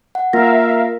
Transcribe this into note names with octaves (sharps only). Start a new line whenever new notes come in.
F#5
A#3 F4 A#4 E5 F5 A#6